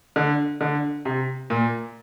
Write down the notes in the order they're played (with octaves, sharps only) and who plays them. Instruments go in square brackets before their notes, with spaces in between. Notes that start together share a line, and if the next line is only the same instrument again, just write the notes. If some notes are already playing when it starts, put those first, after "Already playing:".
[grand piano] D3
D3
C3
A#2